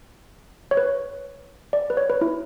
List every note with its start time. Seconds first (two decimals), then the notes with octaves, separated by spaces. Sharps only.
0.71 C#5
0.77 B4
1.73 D5
1.90 B4
1.97 C#5
2.10 B4
2.21 E4